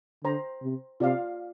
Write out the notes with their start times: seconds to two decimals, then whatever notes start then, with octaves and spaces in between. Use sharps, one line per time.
0.24 D3 C5 A#5
0.63 C3
1.00 C3 F4 D5 F5